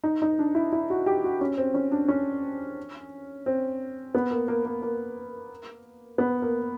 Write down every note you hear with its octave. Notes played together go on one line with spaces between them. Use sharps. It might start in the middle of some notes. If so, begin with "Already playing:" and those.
D#4
D#4
D4
E4
E4
F#4
G4
F#4
C#4
C4
C#4
D4
C#4
C4
B3
A#3
A#3
A#3
A#3
B3
A#3